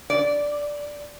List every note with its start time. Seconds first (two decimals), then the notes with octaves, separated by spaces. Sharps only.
0.10 D5